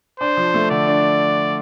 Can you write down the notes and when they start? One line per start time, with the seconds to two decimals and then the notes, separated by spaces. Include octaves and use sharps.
0.20 D4 C5
0.37 F3
0.54 A3
0.71 D3 D5
0.87 D4